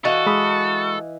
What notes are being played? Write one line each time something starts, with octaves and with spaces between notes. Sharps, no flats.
E3 F#4 A4 D#5 F5
G#3 B5 D#6